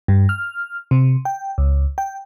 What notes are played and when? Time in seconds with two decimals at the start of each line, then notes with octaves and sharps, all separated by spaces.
0.08 G2
0.29 F6
0.91 C3
1.25 G5
1.58 C#2
1.98 G5